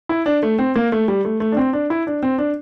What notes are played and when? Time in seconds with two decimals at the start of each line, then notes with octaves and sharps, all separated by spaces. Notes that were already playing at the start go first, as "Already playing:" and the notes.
0.09 E4
0.26 D4
0.43 A3
0.59 C4
0.76 A#3
0.92 A3
1.08 G3
1.25 A3
1.40 A3
1.52 D4
1.57 C4
1.73 D4
1.90 E4
2.07 D4
2.23 C4
2.38 D4